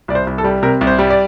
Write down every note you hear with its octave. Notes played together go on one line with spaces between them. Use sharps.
C2 D5
C5
C2
A4
G3
C3 A#4
C2
C5
G3
D5